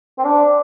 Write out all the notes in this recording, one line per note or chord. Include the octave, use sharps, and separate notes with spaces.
C4
D4